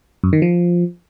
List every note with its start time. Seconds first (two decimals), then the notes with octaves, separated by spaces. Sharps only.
0.24 F#2
0.33 D#3
0.42 F3